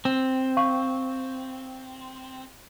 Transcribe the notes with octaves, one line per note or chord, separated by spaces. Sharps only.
C4
F5 C#6